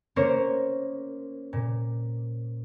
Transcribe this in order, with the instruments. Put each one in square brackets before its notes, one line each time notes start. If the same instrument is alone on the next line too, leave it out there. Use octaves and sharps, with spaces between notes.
[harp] A#3 C#4 A#4 C5 C#5
A#2